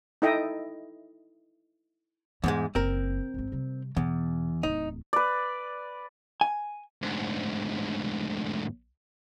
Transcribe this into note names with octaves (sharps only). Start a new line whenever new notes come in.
D#4 E4 A4 D#5 E5 G5
E2 G#2 G3 G#3
F#1 C4 A#4
G#1 G#2
C3 G3
E2 B2
D1 E2 D#4
B4 D5
G#5
D2 G#2